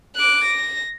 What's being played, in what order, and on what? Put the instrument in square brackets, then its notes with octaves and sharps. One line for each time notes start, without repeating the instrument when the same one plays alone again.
[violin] D6 F#6
A#6